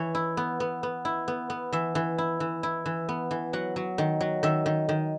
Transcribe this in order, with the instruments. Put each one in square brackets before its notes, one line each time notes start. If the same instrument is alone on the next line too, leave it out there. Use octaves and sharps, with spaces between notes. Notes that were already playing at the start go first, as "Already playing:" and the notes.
Already playing: [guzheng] E3 C#5
E4
B3
B3
B3
E4
B3
B3
E3 E5
E3
E4
E3
E4
E3
B3
E3
F#3 F#5
F#3
D#3
F#3
D#3 E5
D#3
D#3